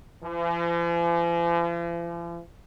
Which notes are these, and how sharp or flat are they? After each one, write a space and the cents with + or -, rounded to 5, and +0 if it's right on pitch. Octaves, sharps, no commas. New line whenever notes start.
F3 -45